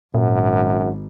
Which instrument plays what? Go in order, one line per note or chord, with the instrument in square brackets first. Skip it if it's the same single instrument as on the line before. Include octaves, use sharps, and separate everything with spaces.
[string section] G#1 [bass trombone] F#2 [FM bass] A#2